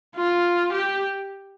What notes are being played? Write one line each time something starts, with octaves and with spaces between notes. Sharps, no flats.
F4
G4